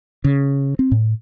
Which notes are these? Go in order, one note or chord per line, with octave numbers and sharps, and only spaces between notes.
C#3
C4
A2